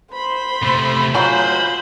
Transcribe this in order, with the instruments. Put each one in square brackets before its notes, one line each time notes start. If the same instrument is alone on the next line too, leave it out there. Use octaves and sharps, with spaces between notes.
[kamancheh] C5 C6 [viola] B5
[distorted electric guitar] C3 A3
[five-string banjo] F#3 G#3 A#4 [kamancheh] F4 G#5 [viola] C5 [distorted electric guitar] B5